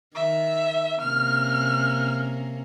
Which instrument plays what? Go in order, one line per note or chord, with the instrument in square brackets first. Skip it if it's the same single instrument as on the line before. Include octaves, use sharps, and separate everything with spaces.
[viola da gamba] D#3 [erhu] E5
[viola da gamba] C3 A#3 C#4 [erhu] F6